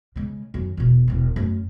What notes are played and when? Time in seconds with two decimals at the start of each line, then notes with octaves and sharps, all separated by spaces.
0.16 C#3 G#3
0.54 F#2 D#3
0.77 E1 B2
1.08 E1 C2
1.36 F#2 A3